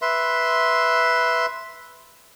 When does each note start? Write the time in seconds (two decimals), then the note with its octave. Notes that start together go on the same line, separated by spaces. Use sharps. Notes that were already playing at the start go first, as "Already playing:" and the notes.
0.02 B4 E5 C6